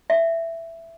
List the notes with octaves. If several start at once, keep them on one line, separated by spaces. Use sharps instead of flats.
E5